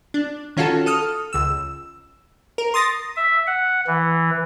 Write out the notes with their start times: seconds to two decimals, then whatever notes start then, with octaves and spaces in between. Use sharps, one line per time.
0.14 D4
0.57 D#3 C#4 F4 F#4 A4
0.86 A4 D#6 F6
1.33 C#2 E6
2.58 A#4
2.74 C6 D#6 A6 A#6
3.16 E5
3.47 F#5
3.87 E3